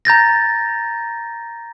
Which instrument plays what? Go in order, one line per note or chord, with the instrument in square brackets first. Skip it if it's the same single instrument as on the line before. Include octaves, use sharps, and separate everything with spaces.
[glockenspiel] A#5 G6 A6 A#6